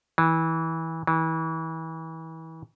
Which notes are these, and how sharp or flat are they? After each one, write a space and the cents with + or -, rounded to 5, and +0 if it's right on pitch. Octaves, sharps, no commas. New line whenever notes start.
E3 -20
E3 -30